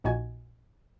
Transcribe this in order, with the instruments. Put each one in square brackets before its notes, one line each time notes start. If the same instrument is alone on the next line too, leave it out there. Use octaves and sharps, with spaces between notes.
[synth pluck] A#1 A#2 D#4 F#4 G#5 G#6